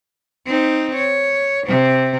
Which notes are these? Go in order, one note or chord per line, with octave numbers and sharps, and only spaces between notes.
C4 D#4
C#5
C3 C4